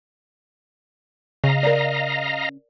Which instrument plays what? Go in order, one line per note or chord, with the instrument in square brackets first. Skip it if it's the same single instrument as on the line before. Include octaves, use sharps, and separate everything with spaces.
[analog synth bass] C#3 [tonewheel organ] D#5 F5 A#5
[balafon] A#4 D5